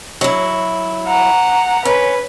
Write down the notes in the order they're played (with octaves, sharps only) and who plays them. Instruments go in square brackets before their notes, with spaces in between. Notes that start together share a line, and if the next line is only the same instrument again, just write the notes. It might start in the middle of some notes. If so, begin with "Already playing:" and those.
[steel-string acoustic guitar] F#3 E4
[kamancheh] F#5 A#5
[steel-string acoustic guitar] C#4 [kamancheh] B4